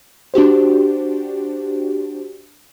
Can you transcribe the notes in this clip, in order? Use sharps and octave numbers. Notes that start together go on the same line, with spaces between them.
D4 F#4 G4 C5